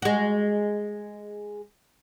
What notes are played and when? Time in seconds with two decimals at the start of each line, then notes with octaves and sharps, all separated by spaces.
0.02 G#3 F#4